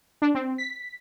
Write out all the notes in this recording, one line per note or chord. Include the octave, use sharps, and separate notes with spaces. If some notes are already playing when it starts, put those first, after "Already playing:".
D4
C4
B6